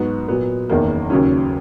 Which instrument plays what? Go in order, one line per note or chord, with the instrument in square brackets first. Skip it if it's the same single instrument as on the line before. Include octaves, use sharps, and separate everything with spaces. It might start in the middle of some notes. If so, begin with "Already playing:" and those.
Already playing: [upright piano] G#2 F#3 B3 F#4
A#2 F#3 B3
F#1 E2 D#3 A#3
D#2 C#3 F#3 C#4